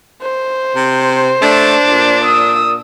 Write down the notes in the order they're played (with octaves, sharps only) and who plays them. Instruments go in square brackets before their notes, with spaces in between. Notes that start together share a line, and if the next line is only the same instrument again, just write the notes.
[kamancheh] C5
[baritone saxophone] C3
[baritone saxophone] A3 [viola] D4
[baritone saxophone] A#2
[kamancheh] D#6 E6